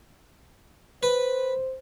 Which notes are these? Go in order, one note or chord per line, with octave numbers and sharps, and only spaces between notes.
B4 C5